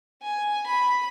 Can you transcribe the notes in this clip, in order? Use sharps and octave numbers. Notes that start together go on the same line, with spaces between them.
G#5
B5